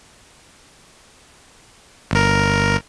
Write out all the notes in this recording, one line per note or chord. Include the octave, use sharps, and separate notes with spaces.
G1 A#4